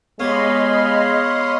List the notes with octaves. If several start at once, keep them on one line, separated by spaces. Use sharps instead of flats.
G#3 B3 G4 C#5 D#5 F5 B5 C6